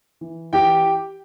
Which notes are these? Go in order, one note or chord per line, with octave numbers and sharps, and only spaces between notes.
E3
E3 G4 G5